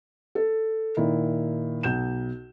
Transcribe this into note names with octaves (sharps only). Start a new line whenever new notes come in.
A4
A#2 D#3 E4
B1 G6 E7